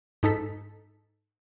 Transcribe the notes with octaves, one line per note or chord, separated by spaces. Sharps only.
G#2 D#4 A4 B6